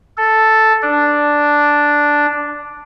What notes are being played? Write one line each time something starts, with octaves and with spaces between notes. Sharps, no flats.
A4
D4